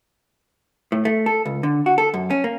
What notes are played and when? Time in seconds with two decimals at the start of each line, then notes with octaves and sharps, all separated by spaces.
0.92 A2
1.05 A3
1.26 A4
1.45 C#2
1.63 D3
1.86 F#4
1.98 A4
2.14 F#2
2.30 C#4
2.44 A#3